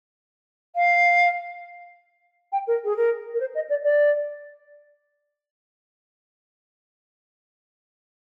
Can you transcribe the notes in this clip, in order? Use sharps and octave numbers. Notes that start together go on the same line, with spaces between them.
F5
G5
A#4
G#4
A#4
A#4
C5
D#5
D5
D5